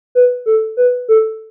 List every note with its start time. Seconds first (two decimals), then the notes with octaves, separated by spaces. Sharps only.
0.15 B4
0.46 A4
0.77 B4
1.09 A4